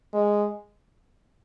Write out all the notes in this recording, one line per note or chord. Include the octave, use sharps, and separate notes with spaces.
G#3